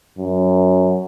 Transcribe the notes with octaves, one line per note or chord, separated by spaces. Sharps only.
F#2